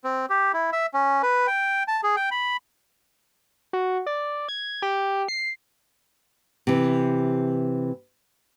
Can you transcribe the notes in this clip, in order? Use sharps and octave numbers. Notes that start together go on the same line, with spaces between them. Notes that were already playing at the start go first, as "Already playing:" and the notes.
C4
G4
E4
E5
C#4
B4
G5
A5
G#4
G5
B5
F#4
D5
G#6
G4
C7
C3 E3